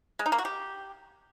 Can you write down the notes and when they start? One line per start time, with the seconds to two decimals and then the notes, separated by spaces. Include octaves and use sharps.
0.19 G#3
0.26 D#4
0.32 A#3
0.38 F#4
0.45 G4